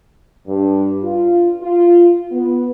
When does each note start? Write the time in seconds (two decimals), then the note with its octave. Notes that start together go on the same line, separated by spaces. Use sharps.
0.47 G2
1.03 F4
1.61 F4
2.31 B3